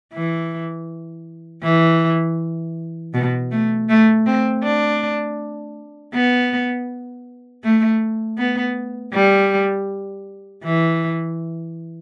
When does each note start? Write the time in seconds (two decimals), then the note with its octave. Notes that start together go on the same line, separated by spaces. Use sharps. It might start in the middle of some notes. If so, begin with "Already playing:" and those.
0.14 E3
1.63 E3
3.14 B2
3.51 A3
3.89 A3
4.26 C4
4.63 D4
6.14 B3
7.64 A3
8.38 B3
9.13 G3
10.64 E3